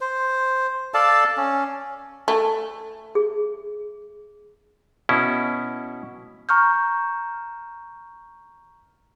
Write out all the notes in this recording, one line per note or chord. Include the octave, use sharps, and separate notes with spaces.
C5
A4 D5 F5 A5
C#4
A3 G#5
G#4
B2 C#4 E4 B4
A#5 C#6 F6 G6